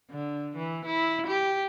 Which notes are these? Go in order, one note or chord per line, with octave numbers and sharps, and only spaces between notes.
D3
E3
E4
G4